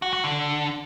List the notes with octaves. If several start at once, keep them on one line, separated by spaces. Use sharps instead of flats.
F#4
F#4
D3